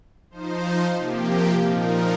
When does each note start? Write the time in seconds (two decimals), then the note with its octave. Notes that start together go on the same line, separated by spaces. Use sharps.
0.30 F3 D#4 C5
0.97 C3 F3 A#3 G4
1.66 A#2 F3 D#4 A#4